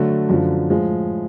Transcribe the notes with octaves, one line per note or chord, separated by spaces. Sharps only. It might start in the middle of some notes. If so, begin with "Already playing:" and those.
Already playing: D3 F#3 A3
F#2 D3 F3
A2 F3 G#3